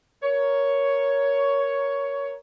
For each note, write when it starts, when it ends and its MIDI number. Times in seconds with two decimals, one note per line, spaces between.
0.23 2.34 70
0.23 2.34 73